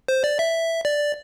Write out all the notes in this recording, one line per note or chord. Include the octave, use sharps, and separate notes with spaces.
C5
D5
E5
D5